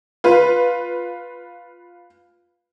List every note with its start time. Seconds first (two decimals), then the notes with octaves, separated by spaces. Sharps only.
0.24 F4 B4